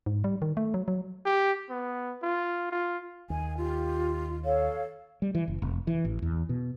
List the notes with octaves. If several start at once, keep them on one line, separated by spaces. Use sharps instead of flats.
G#2
G3
D#3
A3
F#3
F#3
G4
B3
F4
F4
D#2 G#5
F4 G4
A4 C#5 F5
G3
E3
F#1
F1
E3
A1
E2
B2